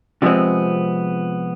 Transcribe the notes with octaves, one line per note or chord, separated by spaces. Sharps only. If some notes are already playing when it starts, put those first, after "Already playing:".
C3 F3 G3 G#3 B3 C4